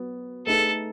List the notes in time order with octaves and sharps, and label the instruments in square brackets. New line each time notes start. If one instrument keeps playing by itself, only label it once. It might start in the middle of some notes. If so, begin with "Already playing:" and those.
Already playing: [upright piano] F#3 B3 F#4
[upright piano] A3 D#4 G#4 B4 [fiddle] A4